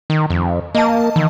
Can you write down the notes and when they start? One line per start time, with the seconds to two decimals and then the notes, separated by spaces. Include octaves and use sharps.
0.10 D#3
0.30 F2
0.75 A#3 D#5 A5
1.16 D#3 E3